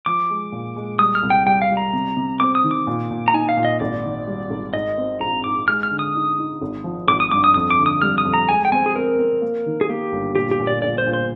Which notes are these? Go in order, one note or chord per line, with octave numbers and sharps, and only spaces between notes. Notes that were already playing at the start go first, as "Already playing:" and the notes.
F3 D6
G#3
A#2
G#3
G3 D#6
F6
C2
G5
G3 G5
F5
G3
A#5
C3
C3
C4 D6
D#6
D#3
D6
A#2
A#2
A#5
D#4 G#5
F5
A#2
D#5
G#1 D5
D#3
G3
G#1
G#2 D#5
C4
A#1 A#5
G#2 D6
G#3 F6
F6
D3
D#6
D#4
D#4
G#1
F3
G#1 D6
D#6
G2 D6
D#6
F2 D#6
D6
D3
D#6
G3 F6
D#6
F2
A#5
G#3 G#5
G5
C4 G#5
G#4
C4 A#4
C4
A#3
D#3
G#4
A#3 G4
G1
A#2 G4
G4
A#2
D5
A#1 D5
C5
A#2
C5